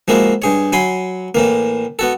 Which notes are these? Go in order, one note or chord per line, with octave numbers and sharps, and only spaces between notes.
F3 G#3 A#3 E4 F#4
G2 G#4 C#5
F#3 G#5 B5 C6
A2 E3 A#3
B3 F#4 A4